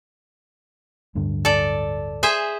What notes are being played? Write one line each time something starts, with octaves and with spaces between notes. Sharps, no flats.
D1 G2 D3
A4 D5
G#4 C5 E5